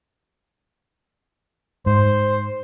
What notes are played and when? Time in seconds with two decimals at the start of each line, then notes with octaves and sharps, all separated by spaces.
1.86 G#2 C5